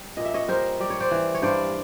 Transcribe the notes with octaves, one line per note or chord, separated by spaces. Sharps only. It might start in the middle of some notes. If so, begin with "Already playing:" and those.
Already playing: G3
A#2 D#5
E5
C#5 D#5
G3 A#4 C5
G3 D5
C#5
C5 D5
E3
C#5
G2 C5 D5